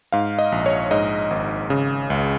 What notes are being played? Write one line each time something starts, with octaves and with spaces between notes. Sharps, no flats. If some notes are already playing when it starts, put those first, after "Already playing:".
G#2 F5
D#5
A#1
C#5
G#2 D#5
G#1
C#3
C#2